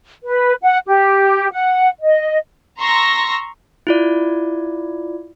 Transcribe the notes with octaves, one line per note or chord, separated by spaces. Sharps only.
B4
F#5
G4
F#5
D#5
A#5 C6 C#6 E6 A#6
E4 F4 D5